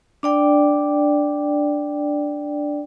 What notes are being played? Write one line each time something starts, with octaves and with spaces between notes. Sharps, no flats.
D4 D5 G5